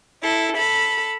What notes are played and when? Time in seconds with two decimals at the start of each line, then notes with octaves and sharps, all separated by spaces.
0.21 E4 A4
0.56 A4 B5